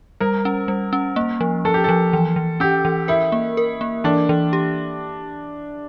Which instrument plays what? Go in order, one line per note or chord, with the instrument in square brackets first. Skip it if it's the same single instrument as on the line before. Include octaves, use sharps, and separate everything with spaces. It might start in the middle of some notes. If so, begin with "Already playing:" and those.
[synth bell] G3 [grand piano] A#4
[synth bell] C#4
G3
C#4
A#3
F3
[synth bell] F3 [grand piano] A4
[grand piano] G4
[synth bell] F3 [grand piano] A4
[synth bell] E3
E3
[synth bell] C#4 [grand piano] G4
[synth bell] E3
[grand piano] E4 [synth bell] A#4
[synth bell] A#3
A#4
A#3
[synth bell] E3 [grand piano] D4
[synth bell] E3
G4